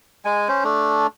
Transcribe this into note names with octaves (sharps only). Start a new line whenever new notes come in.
G#3 G#5
C#4 C5
A3 D4